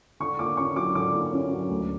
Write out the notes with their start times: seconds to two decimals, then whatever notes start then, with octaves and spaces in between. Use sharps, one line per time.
0.20 D3 C#6
0.39 A#3 D6
0.57 C#4 C#6
0.76 F#3 D6
0.95 D3 D6
1.14 A#3
1.32 C#4
1.52 F#3
1.70 D2